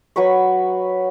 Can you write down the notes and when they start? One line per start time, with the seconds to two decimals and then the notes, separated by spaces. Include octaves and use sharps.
0.16 F#3 B4 B5 C#6